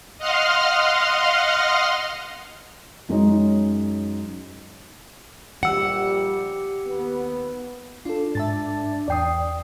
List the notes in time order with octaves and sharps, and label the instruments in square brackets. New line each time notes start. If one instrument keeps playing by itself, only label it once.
[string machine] D#5 F5 F#5 C6 F6
[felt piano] F#2 F#3 G#3 C#4 D#4
[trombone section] A#1 G3 [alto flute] G4 [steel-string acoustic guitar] F#5 [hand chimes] E6 C#7
[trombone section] D#2 B3
[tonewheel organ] D4 [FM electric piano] F4 A4
[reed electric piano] G#2 [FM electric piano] E5 A5 A6
[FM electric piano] E2 C7 [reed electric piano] D5 G5 D#6